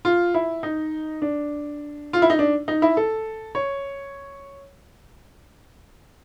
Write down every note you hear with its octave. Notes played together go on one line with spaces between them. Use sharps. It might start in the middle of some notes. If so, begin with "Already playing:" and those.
F4
E4
D#4
D4
F4
E4
D#4
D4
D#4
E4
A4
C#5